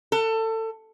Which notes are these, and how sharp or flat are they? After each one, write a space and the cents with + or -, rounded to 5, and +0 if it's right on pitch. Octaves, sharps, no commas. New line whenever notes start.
A4 +25